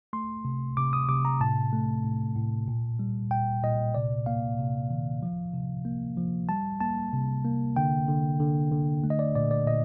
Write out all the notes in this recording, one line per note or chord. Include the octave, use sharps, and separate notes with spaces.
A3 C6
C3
C3 D6
D#6
C3 D6
A#5
A2 A5
A3
A2
A2
A#2
G3
A#2 G5
A#2 D#5
C3 D5
A#3 F5
C3
D#3
F3
C3
A#3
F3
G3 A5
A#3 A5
C3
A#3
D3 G5
D3
D3
D3
A3
D#5
D5
A#2 D5
D5
A#2 D#5